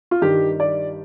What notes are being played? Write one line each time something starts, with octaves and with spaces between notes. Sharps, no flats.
F4
G2 D#3 G3 G4
D5